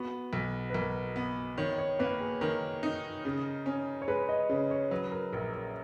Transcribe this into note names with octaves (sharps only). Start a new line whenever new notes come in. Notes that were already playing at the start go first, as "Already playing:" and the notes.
Already playing: B3 F#4
B1
B4
B1 A#4
B3
D#3 C#5
C#5
A#3 B4
G#4
D#3 A#4
D#4
C#3
C#4
C#5
G#3 B4
D#5
C#3 C#5
C#5
F#3 B4
A#4
A#1 A#4
A#4